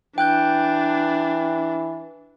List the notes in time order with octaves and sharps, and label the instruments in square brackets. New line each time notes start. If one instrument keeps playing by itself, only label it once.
[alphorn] E3 [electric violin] D4 [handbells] G5 F#6 G6